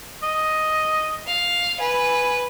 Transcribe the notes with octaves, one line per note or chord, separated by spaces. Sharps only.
D#5
F5
B4 G#5